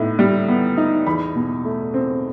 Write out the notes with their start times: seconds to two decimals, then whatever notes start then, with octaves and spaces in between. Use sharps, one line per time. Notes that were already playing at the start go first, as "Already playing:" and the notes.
Already playing: A2 B3 D#4
0.19 G3
0.48 B3
0.77 D#4
1.06 E2 B5
1.35 B2
1.64 A3
1.94 C4